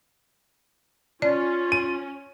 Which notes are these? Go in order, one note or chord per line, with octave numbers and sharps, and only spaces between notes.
C#4 F4 D5
D#7